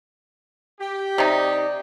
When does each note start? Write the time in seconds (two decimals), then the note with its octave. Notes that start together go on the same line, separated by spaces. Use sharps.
0.80 G4
1.18 C3 D#4 D5